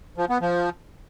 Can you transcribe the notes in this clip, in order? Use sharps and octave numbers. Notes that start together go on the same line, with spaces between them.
F3
B3
F3